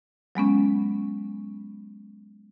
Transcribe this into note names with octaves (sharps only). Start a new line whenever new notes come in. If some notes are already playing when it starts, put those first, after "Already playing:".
F#3 G#3 B3 C#4